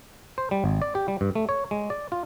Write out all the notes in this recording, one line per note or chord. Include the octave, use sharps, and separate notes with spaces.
C5
G3
G#1
D5
G4
G3
G2
A3
C#5
G#3
D5
F4